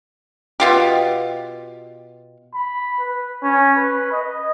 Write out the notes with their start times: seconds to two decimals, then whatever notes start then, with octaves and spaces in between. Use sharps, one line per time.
0.60 B2 F4 G4
2.55 B5
3.00 B4
3.43 C#4
3.77 B4
4.12 D#5